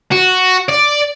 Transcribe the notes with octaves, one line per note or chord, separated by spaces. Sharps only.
F#4
D5